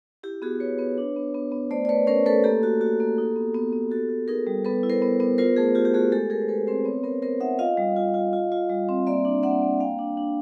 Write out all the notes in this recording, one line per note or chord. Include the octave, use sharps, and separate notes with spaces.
E4 G4
B3 F#4 G#4
E4 B4 C#5
B3 B4 C#5
D4
B3
B3
B3
A3 C5 D5
D5
A3 B4 C#5
C#4 A#4 C5
A3 A4 B4
A#3 G4 A4
F#4
F#4
A#3
D#4
B3
B3
B3
F#4 G4 A4
F#4
D#4 G#4 A#4
G3
B3 A4 B4
E4
A#4 C5
B3
B3
F4 A#4 C5
A3 G#4 A#4
F4 G4
G4
A3 F#4 G#4
G#3 G4 A4
G#3 G#4 A#4
C5
G#3 A4 B4
C4 A#4 C5
B3 B4 C#5
B3 A#4 C5
B3 A#4 C5
D#4 E5 F#5
F4 D#5 F5
G3
F4
F4
F4
F4
G3
C4
A#3 D5 E5
D4
A#3 E5 F#5
A#3
A#3 F5 G5
D4
D4